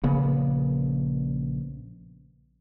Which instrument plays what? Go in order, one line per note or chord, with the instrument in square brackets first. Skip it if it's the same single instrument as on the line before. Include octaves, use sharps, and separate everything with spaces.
[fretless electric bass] A#1 C#3 A#3 B3